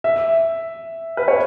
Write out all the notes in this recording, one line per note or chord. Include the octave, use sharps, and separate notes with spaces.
E5
B4
C#5